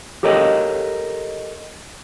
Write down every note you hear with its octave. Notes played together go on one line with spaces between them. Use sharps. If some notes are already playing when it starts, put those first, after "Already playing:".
G4 A4 A#4 C#5 D#5